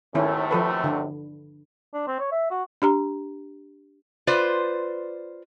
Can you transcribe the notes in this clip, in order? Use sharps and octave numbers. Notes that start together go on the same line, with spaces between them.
F#2 C3 D#3 A3 C#4 E4
F3 A4 B4
D3
D4
C4
C#5
E5
F#4
D4 G4 A#5
F4 B4 C5 D5